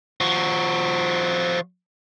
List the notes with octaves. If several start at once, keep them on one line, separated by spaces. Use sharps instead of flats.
F3 F#4